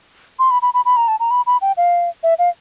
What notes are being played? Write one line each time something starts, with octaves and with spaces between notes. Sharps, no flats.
C6
B5
B5
B5
B5
A#5
A5
A#5
B5
B5
G5
F5
E5
F5